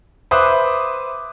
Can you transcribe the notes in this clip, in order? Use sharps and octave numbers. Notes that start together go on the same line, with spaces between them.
B4 C5 E5 D6 D#6 F#6